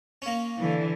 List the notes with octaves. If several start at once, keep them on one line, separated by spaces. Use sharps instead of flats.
A#3 C#4
D3 E3